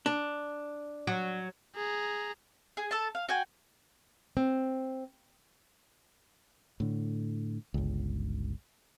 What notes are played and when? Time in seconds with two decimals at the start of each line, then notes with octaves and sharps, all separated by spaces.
0.06 D4
1.07 F#3
1.75 G#4 A#5
2.77 G#4
2.91 A4 A5
3.15 F5
3.29 F#4 G5 G#5
4.37 C4
6.80 A2 D3
7.74 G1 C#2